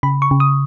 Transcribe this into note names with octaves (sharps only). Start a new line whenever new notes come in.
C#3 B5
C#6
C#3
D#6